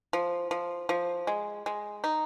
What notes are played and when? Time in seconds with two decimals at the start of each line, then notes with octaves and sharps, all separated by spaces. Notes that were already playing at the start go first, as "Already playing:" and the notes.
0.13 F3
0.51 F3
0.89 F3
1.27 G#3
1.66 G#3
2.04 D#4